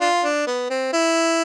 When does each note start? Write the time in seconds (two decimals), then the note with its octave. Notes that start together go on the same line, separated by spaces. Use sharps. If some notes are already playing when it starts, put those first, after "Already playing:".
0.01 D4 F4
0.24 D4
0.47 B3
0.70 C4
0.93 E4